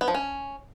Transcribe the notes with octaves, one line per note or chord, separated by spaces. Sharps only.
B3
F3
C#4